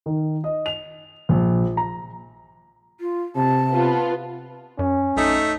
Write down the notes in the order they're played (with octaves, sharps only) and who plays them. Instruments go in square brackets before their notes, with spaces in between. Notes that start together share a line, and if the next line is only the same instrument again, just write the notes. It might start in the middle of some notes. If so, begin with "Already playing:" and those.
[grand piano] D#3
D#5
F7
A#1
A#5
[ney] F4
[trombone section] C3 [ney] A5
[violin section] B3 F4
[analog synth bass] F#2 [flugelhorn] C#4
[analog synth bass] B1 [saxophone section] A3 D#4